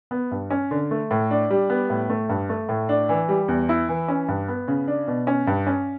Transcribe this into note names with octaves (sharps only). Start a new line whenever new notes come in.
B3
G2
C#4
D3
A3
A2
D4
G3
B3
A2
A3
G2
A3
A2
D4
E3
G3
E2
E4
E3
C#4
G2
B3
C#3
D4
B2
C#4
G2
C#4